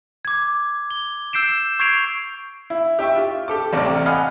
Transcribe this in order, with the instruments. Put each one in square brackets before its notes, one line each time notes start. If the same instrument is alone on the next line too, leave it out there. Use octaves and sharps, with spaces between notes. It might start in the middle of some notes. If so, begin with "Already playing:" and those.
[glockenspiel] D6 G#6
G7
E6 G6 C7 D7 E7
C#6 G6 G#6 C7 D7 F7
[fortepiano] E4
G4 E5 G5 C#6
F4 G4
G4 A4 D6
A1 C3 A3 D5 F6
D#5 F5 F#5 G#5 B5 F6